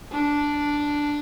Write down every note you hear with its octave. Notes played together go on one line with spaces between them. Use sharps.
D4